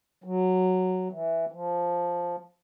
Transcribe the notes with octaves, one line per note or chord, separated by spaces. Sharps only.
F#3
E3
F3